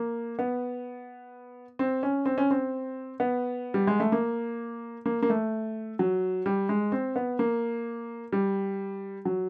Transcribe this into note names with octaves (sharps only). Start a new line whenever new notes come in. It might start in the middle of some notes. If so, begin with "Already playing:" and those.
Already playing: A#3
B3
C4
C#4
C4
C#4
C4
B3
G3
G#3
A3
A#3
A#3
A#3
A3
F#3
G3
G#3
C4
B3
A#3
G3
F#3